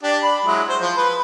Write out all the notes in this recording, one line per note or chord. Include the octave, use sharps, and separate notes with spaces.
D4 G4
B5
F#3 G#3 E4
C5
F3
B4